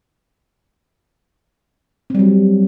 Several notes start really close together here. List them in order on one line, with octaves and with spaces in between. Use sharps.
C4 G3 F#3